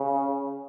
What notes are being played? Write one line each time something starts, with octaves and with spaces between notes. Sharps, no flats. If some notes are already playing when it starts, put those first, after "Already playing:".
Already playing: C#3